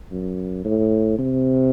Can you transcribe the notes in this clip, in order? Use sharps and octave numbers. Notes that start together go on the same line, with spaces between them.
F#2
A2
C3